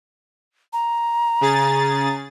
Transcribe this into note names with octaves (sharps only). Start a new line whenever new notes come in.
A#5
C#3 G#4 A6